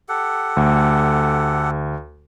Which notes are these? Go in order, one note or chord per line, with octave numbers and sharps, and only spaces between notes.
G4 A4 F#5
D2